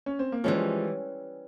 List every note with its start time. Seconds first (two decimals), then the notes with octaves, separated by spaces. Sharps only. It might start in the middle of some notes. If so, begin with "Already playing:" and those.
0.06 C#4
0.19 C4
0.32 A#3
0.44 E3 F3 G3 G#3 C#4